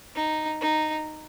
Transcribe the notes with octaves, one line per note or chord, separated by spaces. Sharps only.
D#4
D#4